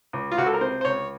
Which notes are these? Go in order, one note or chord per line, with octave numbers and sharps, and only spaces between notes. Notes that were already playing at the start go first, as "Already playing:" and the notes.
C#2
F4
C#2 F#4
A4
A#4
C3 C5
C5
C#2 C#5